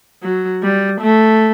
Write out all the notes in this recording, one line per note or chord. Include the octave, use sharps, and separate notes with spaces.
F#3
G3
A3